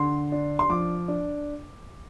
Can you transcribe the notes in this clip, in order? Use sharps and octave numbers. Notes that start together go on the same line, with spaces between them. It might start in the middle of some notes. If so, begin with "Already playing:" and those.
Already playing: D3 C6
D4
C6
F3 D6
D4